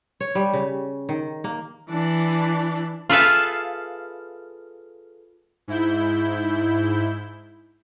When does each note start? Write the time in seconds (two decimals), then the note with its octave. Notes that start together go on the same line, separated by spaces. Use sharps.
0.20 C#5
0.35 G3
0.53 C#3
1.09 D#3
1.44 A#3
1.90 E3 D4
3.09 F4 G#4 A4 B4 E5 F5
5.68 G#2 E4 G6